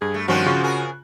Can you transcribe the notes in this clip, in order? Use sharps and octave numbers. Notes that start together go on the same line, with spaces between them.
G2 G#4
A3
G2 D#3 F3 C4 C#4 F#4 F#6
C#3 F4 C#6
G#4 A#4